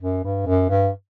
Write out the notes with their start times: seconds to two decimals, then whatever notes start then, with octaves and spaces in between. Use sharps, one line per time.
0.02 F#2
0.24 G2
0.47 F#2
0.69 G2